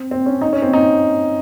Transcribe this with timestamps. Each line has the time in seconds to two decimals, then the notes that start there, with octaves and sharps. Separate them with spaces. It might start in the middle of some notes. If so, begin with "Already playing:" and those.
Already playing: C4
0.11 C4
0.26 C#4
0.41 D#4
0.53 C#4
0.62 C4
0.73 D#4